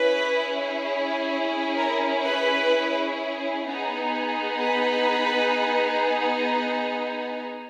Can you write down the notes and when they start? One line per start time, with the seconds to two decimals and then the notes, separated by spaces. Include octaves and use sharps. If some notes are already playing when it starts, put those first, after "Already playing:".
Already playing: C#4 E4 G#4 B4
1.76 A#4
2.24 B4
3.66 B3 D#4 G#4
4.60 B4